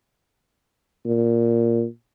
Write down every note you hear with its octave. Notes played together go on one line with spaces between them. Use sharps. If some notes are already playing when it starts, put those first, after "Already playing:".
A#2